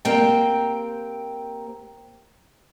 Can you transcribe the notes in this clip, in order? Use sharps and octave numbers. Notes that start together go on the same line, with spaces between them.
A#3 C4 G4 G5